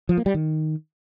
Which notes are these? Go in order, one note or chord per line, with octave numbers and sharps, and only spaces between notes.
F3
A#3
G3
D#3